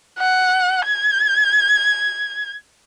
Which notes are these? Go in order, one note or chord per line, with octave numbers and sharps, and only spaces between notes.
F#5
G#6